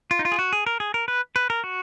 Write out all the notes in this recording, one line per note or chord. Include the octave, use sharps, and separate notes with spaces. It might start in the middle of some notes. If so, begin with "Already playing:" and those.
F4
D#4
F4
G#4
F#4
G#4
A#4
G#4
A#4
B4
B4
A#4
F#4